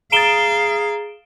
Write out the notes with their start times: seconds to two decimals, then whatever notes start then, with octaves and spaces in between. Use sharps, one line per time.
0.12 G#4 F5 A#5 D#6 A6 D7 E7 G7